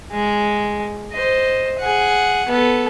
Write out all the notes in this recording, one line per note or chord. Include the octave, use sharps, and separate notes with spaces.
G#3
C5 D#5
G#4 F#5
B3 A4